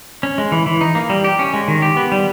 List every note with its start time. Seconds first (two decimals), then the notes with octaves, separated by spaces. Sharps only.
0.23 C#4
0.38 G#3
0.52 E3
0.66 E3
0.81 D#4
0.95 A#3
1.10 G3
1.24 G4
1.39 C#4
1.54 G#3
1.68 D#3
1.82 G4
1.97 B3
2.12 G3